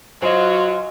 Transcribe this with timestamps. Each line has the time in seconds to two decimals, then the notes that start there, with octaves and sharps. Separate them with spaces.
0.22 F#3 F4 F#4 C5 D#5 G#5